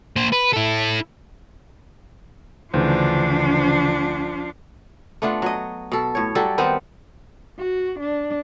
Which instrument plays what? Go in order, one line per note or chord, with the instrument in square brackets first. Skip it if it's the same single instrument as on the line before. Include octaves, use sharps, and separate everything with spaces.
[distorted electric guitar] A#3 C5
B4
E4 A4
[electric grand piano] D2 [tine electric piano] C#3 E3 C5 [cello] F3 D4
[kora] A3 B3 D4 F4
F#3 D#5
B2 A4
A2 C#5
F#3 G3 A4
D#3 B3 C4
[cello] F#4
D4